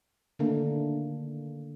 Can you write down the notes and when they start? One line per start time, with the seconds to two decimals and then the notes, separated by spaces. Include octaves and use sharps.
0.39 D3 D#3 A3 A#3 D4